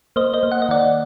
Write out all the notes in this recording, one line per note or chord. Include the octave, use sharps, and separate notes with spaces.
A#3 C5 D#5
C5 D#5
A#3
F#5
D#5
D#3 D5 F#5